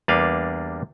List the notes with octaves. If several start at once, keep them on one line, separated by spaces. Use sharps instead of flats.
E2 G3 A#3 D4 B4 F5